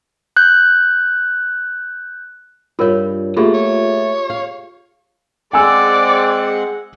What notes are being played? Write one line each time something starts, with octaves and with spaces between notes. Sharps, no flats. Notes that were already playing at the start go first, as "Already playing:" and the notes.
F#6 G6
G2 G3 F4 A#4 C#5
A3 A#3 F4 G4 G#4
C#5
F5
G#3 C4 G#4 D5 F#5 G#5 D6 E6